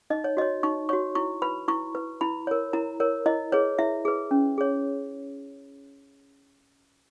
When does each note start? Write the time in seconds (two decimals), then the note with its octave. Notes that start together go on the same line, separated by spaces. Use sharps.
0.10 D#4 D#5
0.24 C#5
0.37 F#4 D#5
0.42 C#5
0.63 D#4 C#6
0.89 F#4 C#5 C#6
1.15 E4 C#6
1.42 B4 B5
1.68 E4 C#6
1.95 B4
2.21 E4 B5
2.47 A#4 C#5
2.73 E4 A#5
3.00 A#4 C#5
3.26 E4 D#5
3.52 G#4 B4 C#5
3.79 E4 E5
4.05 G#4 B4
4.31 C#4
4.58 G#4 C#5